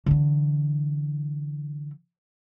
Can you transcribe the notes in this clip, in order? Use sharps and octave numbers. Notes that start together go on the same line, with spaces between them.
D3 E3